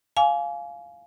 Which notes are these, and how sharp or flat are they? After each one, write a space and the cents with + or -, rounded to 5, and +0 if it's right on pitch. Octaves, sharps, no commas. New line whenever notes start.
F5 +0 G#5 +20 D6 -35